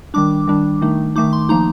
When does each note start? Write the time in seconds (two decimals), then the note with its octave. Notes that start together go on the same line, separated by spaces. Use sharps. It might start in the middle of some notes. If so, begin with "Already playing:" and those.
0.14 D#3 G3 D4 D6
0.47 D#3 G3 D4
0.81 D#3 A3 D#4
1.16 D#3 A3 D#4 D6
1.33 C6
1.49 F3 A#3 D#4 A#5